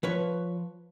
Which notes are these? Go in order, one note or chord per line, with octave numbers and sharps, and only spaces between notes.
F3 B4 C#5